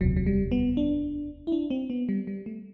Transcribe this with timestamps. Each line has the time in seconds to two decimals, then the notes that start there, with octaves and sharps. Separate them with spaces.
0.01 E1 D2 C3 F#3
0.16 F#3
0.26 G3
0.52 B3
0.77 D4
1.47 E4
1.52 D4
1.70 C4
1.90 B3
2.09 G3
2.27 G3
2.46 A3